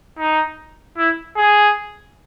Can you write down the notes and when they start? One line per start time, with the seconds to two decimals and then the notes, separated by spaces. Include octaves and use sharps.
0.18 D#4
0.98 E4
1.37 G#4